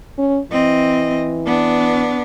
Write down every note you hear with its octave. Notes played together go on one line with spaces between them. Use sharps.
C#4
E3 C4 D#5
B3 D4